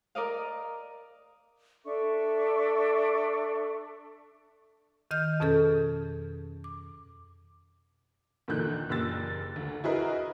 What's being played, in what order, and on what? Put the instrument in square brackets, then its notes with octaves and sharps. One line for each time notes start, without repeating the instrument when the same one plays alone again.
[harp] A#4 D5 D#5 F5
[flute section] D4 A4 E5 C#6
[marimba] D#3 D#5 F6 G6
F2 B2 C#4 G#4 A4 G6
D6
[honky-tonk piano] E2 A#2 D3 D#3 F#6 G6
F#1 A#2 G4 E6 A6
D2
E4 F#4 G#4 A#4 B4 D#5